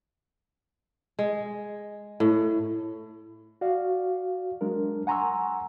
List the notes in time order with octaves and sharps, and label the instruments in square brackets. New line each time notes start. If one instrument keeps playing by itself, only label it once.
[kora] G#3
A2
[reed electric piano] F#4 D5 F5
F#3 G#3 D4 A#4
F#5 G#5 A#5 C6 C#6 E6